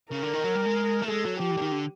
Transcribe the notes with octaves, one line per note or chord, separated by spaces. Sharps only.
C#3 A#4
D3
D#3
F#3
G3
G#3
A3
G#3 A4
F#3
F3 G4
E3
D3
D#3
D3